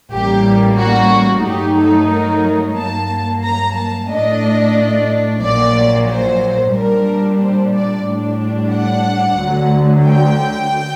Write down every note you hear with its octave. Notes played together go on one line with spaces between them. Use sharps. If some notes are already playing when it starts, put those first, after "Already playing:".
A1 A2 G3 A#3 G4
F#4
G2 F#3 A3 D#4 G4
A4
A#4
G2 F#3 A#3 A5
A#5
A5
A2 A3 D4 D#5
A#1 A#2 F#3 D5
C5
A#2 G3 D4 A#4
C5
D5
A2 G3 D4
F#5
D2 D3 F#3
G5